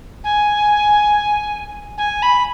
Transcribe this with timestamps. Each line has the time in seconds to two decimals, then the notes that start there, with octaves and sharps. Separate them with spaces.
0.24 G#5
1.98 G#5
2.22 B5